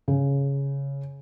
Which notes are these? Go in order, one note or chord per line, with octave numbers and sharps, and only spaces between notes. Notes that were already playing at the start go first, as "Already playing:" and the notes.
C#3